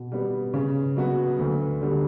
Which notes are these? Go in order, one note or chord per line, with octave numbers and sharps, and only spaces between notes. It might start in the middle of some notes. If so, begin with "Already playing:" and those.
Already playing: B2
G3 B3
C#3
F#3 B3 F#4
D2
D3 G3 B3